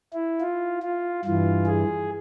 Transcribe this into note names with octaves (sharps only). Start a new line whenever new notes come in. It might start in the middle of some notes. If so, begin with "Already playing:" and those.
E4
F4
F4
G2 E3 F4
G#4